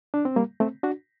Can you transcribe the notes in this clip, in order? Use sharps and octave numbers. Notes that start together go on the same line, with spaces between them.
D4
C4
G3 A#3
A3 C4
D4 F#4